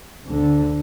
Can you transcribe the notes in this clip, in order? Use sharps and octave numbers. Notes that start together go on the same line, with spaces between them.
D2 D3